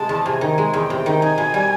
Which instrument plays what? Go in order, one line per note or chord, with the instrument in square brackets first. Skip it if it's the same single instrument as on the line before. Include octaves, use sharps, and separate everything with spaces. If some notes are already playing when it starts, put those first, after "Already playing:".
Already playing: [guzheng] C3 G#3 [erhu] A5
[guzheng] E2
[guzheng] C3 [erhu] G#5
[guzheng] D#3
G#3
[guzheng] E2 [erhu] G5
[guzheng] C3
D#3
[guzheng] D#4 [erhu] G#5
[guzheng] B2
G3